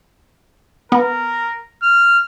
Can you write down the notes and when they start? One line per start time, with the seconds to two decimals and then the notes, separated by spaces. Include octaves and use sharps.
0.92 B3 A#4
1.83 F6